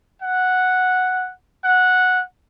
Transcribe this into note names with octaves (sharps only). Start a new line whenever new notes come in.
F#5
F#5